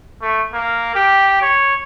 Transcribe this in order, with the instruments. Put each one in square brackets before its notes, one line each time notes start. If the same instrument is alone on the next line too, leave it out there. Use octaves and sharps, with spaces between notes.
[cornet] A3
A#3
G4
C#5